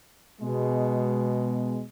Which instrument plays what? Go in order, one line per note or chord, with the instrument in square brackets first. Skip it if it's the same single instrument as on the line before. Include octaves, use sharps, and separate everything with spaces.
[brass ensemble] B2 G#3